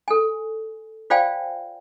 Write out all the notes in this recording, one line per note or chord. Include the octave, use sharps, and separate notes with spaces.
A4 G#5
F4 C5 D5 F5 G5 G#5